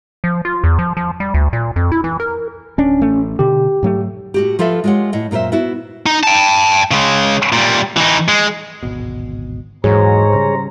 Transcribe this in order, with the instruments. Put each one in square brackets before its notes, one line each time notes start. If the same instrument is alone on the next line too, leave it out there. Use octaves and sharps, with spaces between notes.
[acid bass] F3
F4
E2
F3
F3
G3
D2
A#2
F2
E4
E3
A#4
[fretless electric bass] D1 D4 [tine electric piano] C#4
[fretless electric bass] A1 A3
[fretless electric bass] B2 D3 [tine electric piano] G4
[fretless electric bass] G#2 F#3 A3
[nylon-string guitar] A2 F#4 G4
F3 F4 A4 B4 E5
G#3 F4 G4 C#5 F#5
A2 D#5 F#5
F#2 A#2 A#4 C5 E5
B3 E4 F#4
[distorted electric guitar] D#4
G5 A5
C#3 G#3
A#2 G3
E3 D#4
G#3
[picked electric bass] D1 G#1 B2
[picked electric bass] D#1 E3 F#3 [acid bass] G#2 [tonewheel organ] G#4 C#5 [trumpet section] C5 A#5
[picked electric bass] C#3 G3